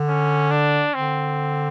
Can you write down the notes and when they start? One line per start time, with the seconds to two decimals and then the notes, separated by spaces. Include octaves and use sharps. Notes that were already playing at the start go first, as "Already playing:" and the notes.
Already playing: D3
0.09 C#4
0.51 D4
0.94 D3 C4